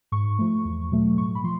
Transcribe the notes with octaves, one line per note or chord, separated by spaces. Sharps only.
G#2 C#6
F3 A3
E2
B2 F#3 A3
A2 C#6
B5
F3 C6